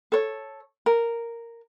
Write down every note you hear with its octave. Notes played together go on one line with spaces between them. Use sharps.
A4 C#5
A#4